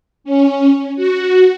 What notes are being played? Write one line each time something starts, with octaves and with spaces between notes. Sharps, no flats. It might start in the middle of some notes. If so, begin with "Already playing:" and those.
C#4
F#4